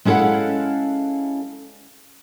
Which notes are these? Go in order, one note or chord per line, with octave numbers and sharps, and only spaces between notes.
G#3 C#4 E4 A4 F5 F#5